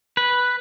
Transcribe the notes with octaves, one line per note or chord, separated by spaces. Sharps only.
B4